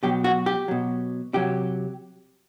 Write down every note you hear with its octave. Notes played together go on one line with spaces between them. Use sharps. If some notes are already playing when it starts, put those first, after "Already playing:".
B2 F#3 G4
F#4
G4
B2 F#3
C3 F#3 G4